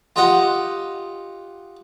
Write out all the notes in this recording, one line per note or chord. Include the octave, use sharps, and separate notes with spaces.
F4 G4 D#5 F#5